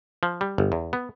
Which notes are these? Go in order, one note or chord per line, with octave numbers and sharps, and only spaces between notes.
F3
G3
G1
E2
B3